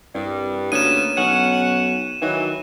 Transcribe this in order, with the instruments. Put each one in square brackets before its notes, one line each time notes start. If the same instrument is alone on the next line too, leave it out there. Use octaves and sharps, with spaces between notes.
[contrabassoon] C2 [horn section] G2
[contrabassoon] D2 [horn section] A#3 B3 C#4 [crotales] D#7 E7
[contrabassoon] B1 [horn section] C#4 F#5
[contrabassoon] D#3 [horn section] E3 F#3